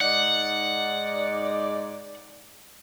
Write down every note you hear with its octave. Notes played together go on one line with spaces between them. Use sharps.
G#2 D#4 D5 F#5